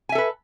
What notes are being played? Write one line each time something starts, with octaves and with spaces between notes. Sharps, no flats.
A4 B4 E5 G#5